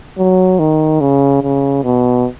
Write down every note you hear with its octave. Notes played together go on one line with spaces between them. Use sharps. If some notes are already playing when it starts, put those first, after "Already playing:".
F#3
D#3
C#3
C#3
B2